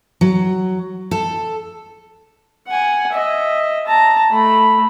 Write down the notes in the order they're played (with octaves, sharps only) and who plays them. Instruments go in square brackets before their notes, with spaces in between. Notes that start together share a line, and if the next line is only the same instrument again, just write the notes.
[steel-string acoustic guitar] F#3
A4
[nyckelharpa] F#5 G#5
D#5 E5
A5 A#5
A3 B5